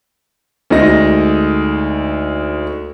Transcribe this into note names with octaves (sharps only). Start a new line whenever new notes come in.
D2 G#3 D#4 D#5 A#6